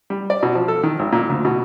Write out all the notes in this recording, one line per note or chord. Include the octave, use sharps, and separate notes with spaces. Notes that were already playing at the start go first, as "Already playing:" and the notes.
G3
D5
B2
F3
A4
D#3
G#1
A#2
D2
B2